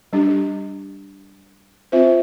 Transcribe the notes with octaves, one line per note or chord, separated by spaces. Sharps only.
G3 D4 G4
C4 F4 C5 E5